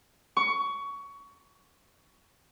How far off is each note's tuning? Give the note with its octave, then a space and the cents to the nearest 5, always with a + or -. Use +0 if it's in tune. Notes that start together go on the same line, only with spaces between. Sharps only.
C#6 +20